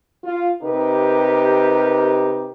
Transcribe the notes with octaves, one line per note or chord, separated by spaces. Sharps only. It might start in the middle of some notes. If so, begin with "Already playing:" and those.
F4
C3 D#4 G4 A#4 B4